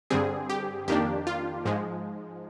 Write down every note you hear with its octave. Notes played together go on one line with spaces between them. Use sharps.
G2 D3 G3 C4 G#4
G4
F2 D#3 A#3 D4 G4
F4
G#2 F3 G#3